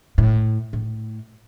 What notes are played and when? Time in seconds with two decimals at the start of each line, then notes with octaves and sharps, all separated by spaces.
0.18 A2
0.73 A2